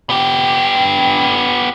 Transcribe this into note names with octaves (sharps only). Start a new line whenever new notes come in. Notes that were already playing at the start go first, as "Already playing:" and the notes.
B3 G4